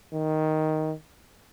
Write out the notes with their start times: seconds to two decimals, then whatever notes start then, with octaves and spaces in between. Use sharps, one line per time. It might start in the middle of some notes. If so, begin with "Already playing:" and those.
0.13 D#3